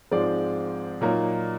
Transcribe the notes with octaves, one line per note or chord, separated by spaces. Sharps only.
G#2 F3 G#3 C4 D5
A#2 F#3 A#3 D#4